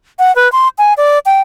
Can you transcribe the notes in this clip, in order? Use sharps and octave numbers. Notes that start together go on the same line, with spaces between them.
F#5
B4
C6
G#5
D5
G5